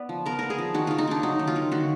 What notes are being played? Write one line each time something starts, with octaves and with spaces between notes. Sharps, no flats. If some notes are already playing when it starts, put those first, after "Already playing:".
Already playing: B3 B4 D5
F3
B3 A#4
B3 A#4
G#4
F3
D#3 F#4
D#3 F4
D#4
A#3 D4
F#3 D#4
D#3
F4
D#3
D3 F#4